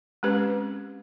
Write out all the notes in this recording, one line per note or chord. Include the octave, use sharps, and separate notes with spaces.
G#3 C4 C#4 G4 B4